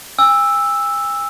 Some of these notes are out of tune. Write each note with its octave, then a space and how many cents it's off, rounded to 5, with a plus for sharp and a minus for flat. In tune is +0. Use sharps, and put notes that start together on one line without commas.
G#5 -45 E6 +0